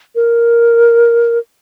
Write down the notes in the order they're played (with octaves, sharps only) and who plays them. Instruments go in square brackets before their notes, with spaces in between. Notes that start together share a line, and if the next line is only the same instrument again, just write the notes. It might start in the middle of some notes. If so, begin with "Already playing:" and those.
[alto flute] A#4